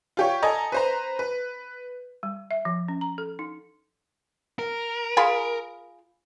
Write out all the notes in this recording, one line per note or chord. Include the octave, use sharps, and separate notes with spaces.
F4 G4 C#5
A4 D#5 G#5 A#5
B4 C5 A#5
B4
G3
E5
F3
C#4
A#5
A4
D#4
A#4
F4 G#4 B5